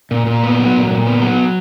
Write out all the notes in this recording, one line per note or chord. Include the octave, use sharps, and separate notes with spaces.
A#2
A#2
B3
F#3
A#2
A#2
B3
F#3